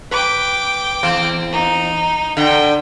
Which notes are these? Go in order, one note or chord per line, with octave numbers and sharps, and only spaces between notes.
B4 G5 D6
E2 C4 C5
D#4
D3 G5